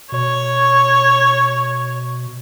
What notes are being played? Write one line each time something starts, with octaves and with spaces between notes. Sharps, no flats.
B2 C#5